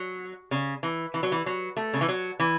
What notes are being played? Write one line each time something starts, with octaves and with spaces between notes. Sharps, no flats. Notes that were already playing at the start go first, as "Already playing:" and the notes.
Already playing: F#3
C#3
E3
E3
F#3
E3
F#3
A3
C#3
E3
F#3
E3